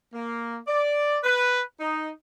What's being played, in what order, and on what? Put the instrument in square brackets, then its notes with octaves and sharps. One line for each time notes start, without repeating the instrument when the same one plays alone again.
[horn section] A#3
D5
B4
D#4